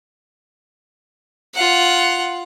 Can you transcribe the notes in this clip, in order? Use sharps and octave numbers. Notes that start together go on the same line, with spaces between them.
F4 F#5